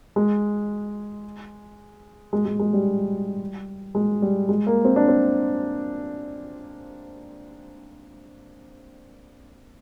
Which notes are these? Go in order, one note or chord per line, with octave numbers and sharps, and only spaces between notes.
G#3
G#3
G#3
G#3
G3
G#3
G3
G#3
A#3
C4
D4
C4